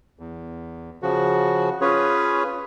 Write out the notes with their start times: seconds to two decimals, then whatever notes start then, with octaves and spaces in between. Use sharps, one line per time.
0.19 E2
1.03 C#3 F3 F#4
1.81 C#4 F4 G#4 B4 C#5